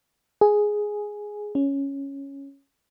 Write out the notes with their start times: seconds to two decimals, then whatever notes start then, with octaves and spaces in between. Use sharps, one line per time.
0.41 G#4
1.55 C#4